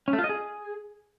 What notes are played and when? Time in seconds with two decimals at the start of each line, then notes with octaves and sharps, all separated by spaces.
0.08 C#4
0.13 A3
0.19 F4
0.24 D#5
0.29 G#4